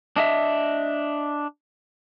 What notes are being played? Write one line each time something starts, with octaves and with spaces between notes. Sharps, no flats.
D4 D#5 E5